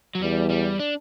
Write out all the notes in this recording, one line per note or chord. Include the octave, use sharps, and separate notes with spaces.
F#3
E2 G3
G3
D4